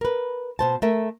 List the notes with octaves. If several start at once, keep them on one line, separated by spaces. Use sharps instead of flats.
A#4 B4
B2 C5 A5
A3 A#4 E5